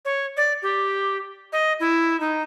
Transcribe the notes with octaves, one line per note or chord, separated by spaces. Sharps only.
C#5
D5
G4
D#5
E4
D#4